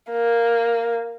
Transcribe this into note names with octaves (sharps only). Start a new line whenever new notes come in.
A#3